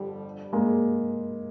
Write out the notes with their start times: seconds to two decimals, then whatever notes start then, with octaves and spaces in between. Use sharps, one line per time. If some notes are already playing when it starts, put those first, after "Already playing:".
Already playing: G1 F2 D3 G3
0.53 G#3 A#3